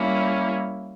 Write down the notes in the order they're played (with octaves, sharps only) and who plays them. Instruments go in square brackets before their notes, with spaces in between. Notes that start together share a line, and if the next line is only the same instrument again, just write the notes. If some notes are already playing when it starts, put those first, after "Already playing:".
Already playing: [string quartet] G3 A#3 C#4 E4